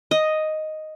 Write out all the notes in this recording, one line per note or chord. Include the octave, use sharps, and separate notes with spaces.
D#5